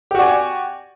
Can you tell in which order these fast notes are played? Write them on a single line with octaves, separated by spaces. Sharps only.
G4 F#4 D5 G#5